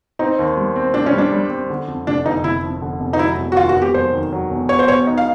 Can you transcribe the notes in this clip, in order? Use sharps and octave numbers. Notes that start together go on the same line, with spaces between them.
C4 D#4
D#2
G3
C4
C4 D4
C#4
G3
D4
G3
C4
D3
F2
F1 D4
F1 D#4
F1 E4
F2
D3
F1
D#4
F#3 E4
E1
F#4
D#2 F4
F#4
E1
G4
F#3 C5
D#3
F#3
E1
B3 C#5
C5
B2 C#5
D#4
F5